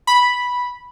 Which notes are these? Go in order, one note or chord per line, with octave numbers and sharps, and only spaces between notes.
B5